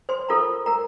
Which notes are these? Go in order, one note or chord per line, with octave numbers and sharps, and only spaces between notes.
C5 C6
F4 A4 A#4 C5 A#5
A#4 A#5